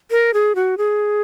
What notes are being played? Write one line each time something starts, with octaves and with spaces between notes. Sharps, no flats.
A#4
G#4
F#4
G#4